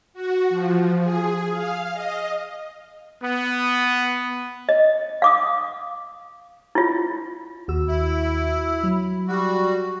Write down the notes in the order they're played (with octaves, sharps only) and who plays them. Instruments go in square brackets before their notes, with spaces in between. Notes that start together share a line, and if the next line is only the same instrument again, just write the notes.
[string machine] F#4
F3
G#4
F5
D#5
[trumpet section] B3
[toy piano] D#5
F5 D6 D#6
E4 F4
[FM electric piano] D#2 F#4 E6
[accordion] E4
[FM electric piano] F#3
[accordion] G3 F#4